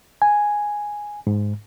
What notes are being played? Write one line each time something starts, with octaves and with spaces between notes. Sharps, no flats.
G#5
G#2